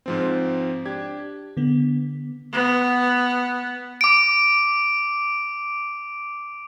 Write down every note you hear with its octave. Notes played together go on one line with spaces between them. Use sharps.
G#2 F3 C4
D4 G4 G#6
D3 B3
B3
D6 D7